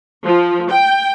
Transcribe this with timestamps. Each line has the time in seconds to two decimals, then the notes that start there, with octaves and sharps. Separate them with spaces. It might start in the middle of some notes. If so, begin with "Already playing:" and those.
0.23 F3
0.69 G5